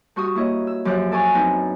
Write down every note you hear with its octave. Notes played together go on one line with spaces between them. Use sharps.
G2 F#4 C#6 D#6
A#3 E4 C#5 D#5
E6
F#2 F3 G4 D6 F#6
A4 D5 G#5 C#6
B3 C4 D4 D#4